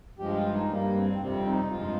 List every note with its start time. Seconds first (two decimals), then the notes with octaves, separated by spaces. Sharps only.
0.19 G2 F3 G#3 G4
0.35 F4
0.53 D#4
0.69 G2 G3 A#3
0.95 C4
1.20 F2 C3 G3 C4
1.45 D#4
1.70 G2 F3 G#3 F4